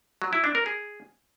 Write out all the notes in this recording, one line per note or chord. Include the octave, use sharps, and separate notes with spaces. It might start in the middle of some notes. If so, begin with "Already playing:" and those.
F#3
E4
D4
A#4
G#4